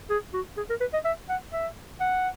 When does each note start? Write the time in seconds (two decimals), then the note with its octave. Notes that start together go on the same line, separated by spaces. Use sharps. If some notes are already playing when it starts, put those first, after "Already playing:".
0.10 G#4
0.34 F#4
0.57 G#4
0.70 A#4
0.81 B4
0.93 D#5
1.05 E5
1.29 F#5
1.53 E5
2.00 F#5